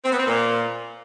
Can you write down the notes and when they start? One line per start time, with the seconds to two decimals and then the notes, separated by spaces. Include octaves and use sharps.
0.04 C4
0.12 B3
0.19 C4
0.27 A#2